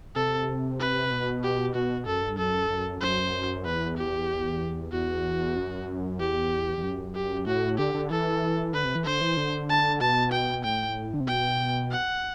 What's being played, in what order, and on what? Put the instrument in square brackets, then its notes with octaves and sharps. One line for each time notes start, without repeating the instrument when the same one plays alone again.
[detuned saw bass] C3 [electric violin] A4
[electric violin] B4
[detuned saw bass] B2
[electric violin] G4
[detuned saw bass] B2 [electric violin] F#4
[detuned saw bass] F#2 [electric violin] A4
[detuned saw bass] G2
[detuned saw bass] F#2 [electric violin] A4
[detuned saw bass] F#2
[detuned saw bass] F#2 [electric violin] C5
[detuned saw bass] E2 [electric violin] B4
[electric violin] G4
[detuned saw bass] E2 [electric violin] F#4
[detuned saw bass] F#2
[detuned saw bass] E2 [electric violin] G4
[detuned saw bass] E2
F#2
[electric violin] G4
[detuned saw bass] A2 [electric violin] F#4
[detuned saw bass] D3 [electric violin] G4
[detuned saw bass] D3
[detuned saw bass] E3 [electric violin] A4
[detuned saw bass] D3 [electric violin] B4
[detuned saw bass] C3
E3
[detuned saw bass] D3 [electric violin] C5
[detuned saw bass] E3
D3
[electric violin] A5
[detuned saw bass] B2 [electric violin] A5
[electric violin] G5
[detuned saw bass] A2 [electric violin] G5
[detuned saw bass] D3
C3
[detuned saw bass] B2 [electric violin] G5
[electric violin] F#5